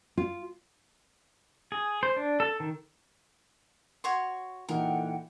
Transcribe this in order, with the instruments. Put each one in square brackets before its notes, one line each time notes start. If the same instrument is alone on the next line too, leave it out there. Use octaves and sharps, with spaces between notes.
[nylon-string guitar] F4
[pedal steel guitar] G#4
C5
D4
A4
D#3
[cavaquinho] F#4 C#5 C6
[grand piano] A#2 E3 D#4 [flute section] A4 F#5 G5 [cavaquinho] A#4